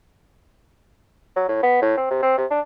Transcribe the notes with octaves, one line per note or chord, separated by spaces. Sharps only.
F#3
A2
B3
A2
C4
C3
C4
C3
D4